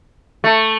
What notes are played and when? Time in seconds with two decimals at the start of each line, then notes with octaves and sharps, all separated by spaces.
0.44 A3